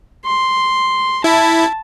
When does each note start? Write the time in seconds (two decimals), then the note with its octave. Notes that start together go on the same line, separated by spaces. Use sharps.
0.25 C6
1.24 E4 A5